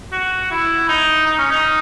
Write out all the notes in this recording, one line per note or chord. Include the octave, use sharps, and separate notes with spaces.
F#4
E4
D#4
D#4
C#4
D#4